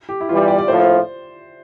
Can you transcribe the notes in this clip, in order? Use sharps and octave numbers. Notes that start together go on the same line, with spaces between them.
G4
E4
E2 E3 G3 F4
G4
D5
D5
A#1 A2 F3 C5